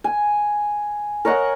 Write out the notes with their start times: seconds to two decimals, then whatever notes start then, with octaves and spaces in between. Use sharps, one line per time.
0.04 G#5
1.25 A#4 C#5 D#5 F#5